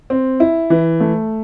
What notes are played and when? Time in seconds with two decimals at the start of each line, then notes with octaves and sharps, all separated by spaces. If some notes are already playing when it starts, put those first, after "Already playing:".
0.10 C4
0.40 E4
0.70 E3
1.01 A3